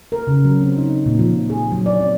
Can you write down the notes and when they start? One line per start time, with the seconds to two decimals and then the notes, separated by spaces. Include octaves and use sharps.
0.12 A#4
0.27 C#3
0.45 F#3
0.61 C4
0.78 D#4
1.06 A#2
1.19 F3
1.50 G#4
1.72 F#3
1.86 D5
2.00 C4